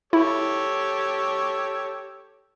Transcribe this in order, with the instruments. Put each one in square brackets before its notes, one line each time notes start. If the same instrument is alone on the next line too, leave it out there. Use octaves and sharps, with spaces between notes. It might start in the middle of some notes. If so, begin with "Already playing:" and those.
[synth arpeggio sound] E4 [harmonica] G4 A4 C#5